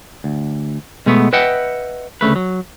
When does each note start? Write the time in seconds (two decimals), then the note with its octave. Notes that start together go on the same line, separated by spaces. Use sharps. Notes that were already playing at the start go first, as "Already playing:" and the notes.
0.24 D2
1.06 B2 G#3 A3 B3
1.33 B4 D#5 E5 F#5 G5
2.21 D2 C#3 A3 B4
2.36 F#3